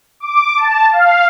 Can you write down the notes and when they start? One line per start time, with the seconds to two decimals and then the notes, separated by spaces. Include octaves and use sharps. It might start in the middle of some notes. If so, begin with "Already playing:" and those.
0.20 D6
0.57 A5
0.92 F5